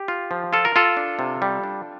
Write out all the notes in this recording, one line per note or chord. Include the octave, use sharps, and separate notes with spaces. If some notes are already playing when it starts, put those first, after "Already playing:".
Already playing: G4
F4
F3
F4 A4
A#4
F4 A4
D4
C3
G3
D4